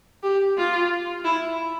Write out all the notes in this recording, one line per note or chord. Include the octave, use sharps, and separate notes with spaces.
G4
F4
E4